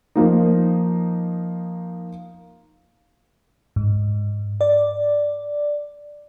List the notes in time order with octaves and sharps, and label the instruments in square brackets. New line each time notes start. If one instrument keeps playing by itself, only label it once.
[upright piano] F3 A#3 D#4
[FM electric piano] G#2
D5